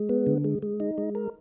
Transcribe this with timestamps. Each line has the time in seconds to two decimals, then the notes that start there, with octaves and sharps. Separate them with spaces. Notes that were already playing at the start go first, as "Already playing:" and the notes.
Already playing: G#3
0.09 B3
0.27 D3
0.44 G#3
0.62 G#3
0.80 D#4
0.98 G#3
1.15 A#4